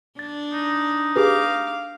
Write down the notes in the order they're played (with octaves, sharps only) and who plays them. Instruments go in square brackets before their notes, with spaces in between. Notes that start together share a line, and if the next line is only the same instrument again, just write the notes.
[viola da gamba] D4 [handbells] A6
[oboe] D#4
[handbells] G4 G#4 B4 [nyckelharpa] F5 D6